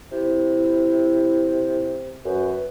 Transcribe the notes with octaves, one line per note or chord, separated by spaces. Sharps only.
C3 E4
F#2 B4